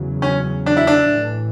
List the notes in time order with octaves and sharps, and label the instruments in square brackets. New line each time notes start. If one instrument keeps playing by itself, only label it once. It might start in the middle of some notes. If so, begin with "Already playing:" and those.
Already playing: [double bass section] E2 C#3 F#3
[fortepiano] C#4
D4
E4
D4
[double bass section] A1 A2 E3